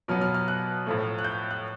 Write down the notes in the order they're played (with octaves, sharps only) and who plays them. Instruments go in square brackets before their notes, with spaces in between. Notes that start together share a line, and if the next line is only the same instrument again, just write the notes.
[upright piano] B2 F#3 B3 F6
F6
F6
F#6
A2 F3 A3
F#6
G6
F#6